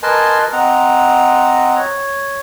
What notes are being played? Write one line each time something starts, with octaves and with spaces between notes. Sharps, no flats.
A#4 B4 D#5 G#5 A5 C6
C4 D#5 F#5 A#5
C#5